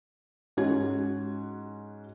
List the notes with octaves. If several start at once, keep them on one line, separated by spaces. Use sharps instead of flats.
G#2 C#4 F#4 G#6